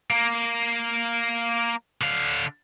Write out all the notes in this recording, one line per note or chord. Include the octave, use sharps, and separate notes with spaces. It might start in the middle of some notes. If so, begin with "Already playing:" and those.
A#3
D3 F5